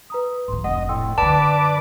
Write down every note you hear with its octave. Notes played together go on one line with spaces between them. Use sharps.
B4 A#5 D#6
G#2 F3 C6
F1 A#1 D#5 F#5
A2 G5 C6 E6
F#2 D3 B4 D5 A5 D6